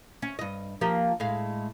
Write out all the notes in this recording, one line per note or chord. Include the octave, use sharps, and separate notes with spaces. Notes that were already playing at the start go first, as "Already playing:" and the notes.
C#4
G2 D#5
F3 A#3 G4
A2 G#3 F5